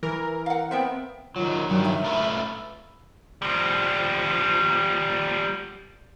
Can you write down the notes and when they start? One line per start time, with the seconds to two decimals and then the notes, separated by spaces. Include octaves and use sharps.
0.03 E3 A#4
0.46 F5 F#5
0.71 B3 C4 A#4 E5 G5
1.36 D#3 F#3 F4
1.69 G2 D#3 F#3
1.86 E5
2.04 A3 F4 B4
3.42 F3 G3